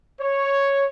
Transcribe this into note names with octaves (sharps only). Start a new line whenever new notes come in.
C#5